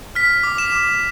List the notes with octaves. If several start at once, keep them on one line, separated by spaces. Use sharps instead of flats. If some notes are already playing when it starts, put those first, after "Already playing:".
F6 B6
D6
E7
D6